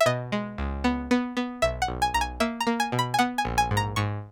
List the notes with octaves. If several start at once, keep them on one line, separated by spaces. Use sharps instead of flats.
E5
B2 D#5
G#3
C#2
B3
B3
B3
B1 E5
F#5
B1
G#5
B1 A#5
G#5
A#3 E5
A#5
A#3
G#5
B2
B5
G#5
B3 F#5
G#5
A#1
G#5
G#2
A#5
G#2 C#6